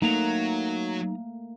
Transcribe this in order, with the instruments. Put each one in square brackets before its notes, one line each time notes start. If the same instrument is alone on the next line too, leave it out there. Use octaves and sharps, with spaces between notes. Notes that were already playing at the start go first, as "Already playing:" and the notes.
[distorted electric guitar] F#3 [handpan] A3 A#3 [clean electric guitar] D#4 A#5